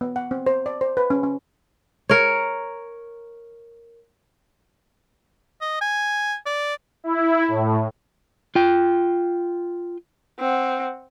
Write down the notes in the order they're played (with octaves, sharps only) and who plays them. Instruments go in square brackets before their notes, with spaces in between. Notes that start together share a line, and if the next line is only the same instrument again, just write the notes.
[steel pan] B3
F#5
C4
C5
D5
C5
B4
C#4
C#4
[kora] A#4 C#5
[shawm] D#5
G#5
D5
[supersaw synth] E4
A2
[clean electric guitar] F4 G5
[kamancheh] C4 F#5